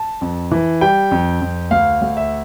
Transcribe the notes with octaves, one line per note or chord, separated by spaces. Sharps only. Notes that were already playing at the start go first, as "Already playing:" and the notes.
Already playing: A5
F2
E3
G3 G5
F2
F2
D2 F5
D2
E5